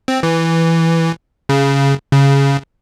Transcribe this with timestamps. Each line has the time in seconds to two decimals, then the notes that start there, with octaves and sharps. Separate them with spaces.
0.08 C4
0.23 E3
1.49 C#3
2.12 C#3